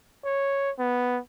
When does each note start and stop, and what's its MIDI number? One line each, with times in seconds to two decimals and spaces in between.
0.25 0.71 73
0.79 1.19 59